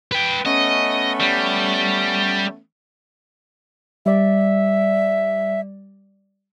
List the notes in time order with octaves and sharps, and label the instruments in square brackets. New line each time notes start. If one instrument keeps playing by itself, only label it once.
[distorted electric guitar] B4 G5
[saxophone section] A3 B3 C#4 [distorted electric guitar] D#5
[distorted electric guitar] G3
[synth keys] G3 D5 [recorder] E5